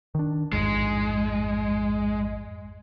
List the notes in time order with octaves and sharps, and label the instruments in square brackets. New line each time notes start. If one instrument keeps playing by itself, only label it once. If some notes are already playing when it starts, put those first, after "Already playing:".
[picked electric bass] D#3 D4
[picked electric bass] A1 F2 G#2 [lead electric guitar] G#3